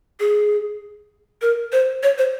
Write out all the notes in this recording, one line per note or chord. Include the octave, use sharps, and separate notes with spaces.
G#4
A#4
C5
C#5
C5